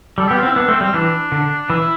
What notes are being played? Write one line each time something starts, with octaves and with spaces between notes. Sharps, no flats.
G3 A4
B3 G4
F4
C4
E4
B3 D4
A3 C4
G3 C4
E3 D4
D3
E3 E4